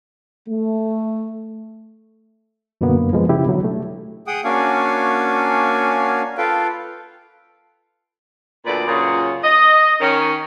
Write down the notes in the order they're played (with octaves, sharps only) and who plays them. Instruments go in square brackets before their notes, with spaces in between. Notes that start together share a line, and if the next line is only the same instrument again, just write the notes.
[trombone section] A3
[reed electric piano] F#2 B2 D3 A#3 B3
F3 G#3 B3
C#3 E4 G4
B2 D3 F#3
A3
[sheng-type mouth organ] G#4 F#5 G5 D#6
A#3 C#4 D4 F#4 F5 G#5
F4 A4 B4 F5 G5
[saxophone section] D2 A#2 B4 D5
F#2 A#2 C#3
D#5
D#3 C#4